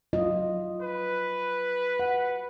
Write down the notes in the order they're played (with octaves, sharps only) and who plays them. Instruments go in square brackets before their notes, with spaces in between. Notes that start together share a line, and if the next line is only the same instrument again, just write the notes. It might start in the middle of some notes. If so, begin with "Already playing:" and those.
[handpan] F#3 F4 D#5
[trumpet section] B4
[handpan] F#5